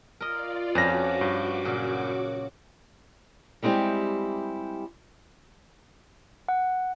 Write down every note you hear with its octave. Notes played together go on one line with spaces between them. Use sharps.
F4 A#4 D5 D#5
F2 F3 C#4 F#4 B4 D6 A#6
G2
A#2 C#3 F#3
G3 G#3 C4 E4 G4
F#5